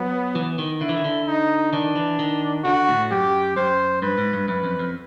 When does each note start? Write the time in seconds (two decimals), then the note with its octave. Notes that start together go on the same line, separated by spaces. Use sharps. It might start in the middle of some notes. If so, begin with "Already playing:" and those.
Already playing: F#3 B3
0.35 E3
0.58 D#3
0.81 D3 E4
0.89 E3
0.97 D#3
1.04 D3
1.28 D#4
1.73 D#3 D4
1.96 E3
2.19 D#3
2.64 D3 F#4
2.88 A2
3.11 F#2 G4
3.57 F#2 C5
4.02 G2 B4
4.18 G#2
4.33 G2
4.48 F#2 B4
4.64 F2
4.79 F2